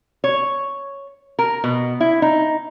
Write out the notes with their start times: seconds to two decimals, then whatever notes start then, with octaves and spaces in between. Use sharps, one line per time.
0.24 C#5
1.39 A#4
1.64 B2
2.00 E4
2.22 D#4